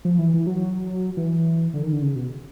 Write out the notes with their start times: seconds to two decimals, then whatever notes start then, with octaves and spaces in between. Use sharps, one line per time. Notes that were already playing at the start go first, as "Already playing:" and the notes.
0.05 F3
0.19 E3
0.34 E3
0.47 F#3
1.17 E3
1.74 D3
1.83 D#3
1.92 D3
2.02 C#3
2.16 B2